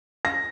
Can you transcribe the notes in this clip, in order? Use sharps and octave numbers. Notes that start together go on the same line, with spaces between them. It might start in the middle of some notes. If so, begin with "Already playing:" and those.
A#6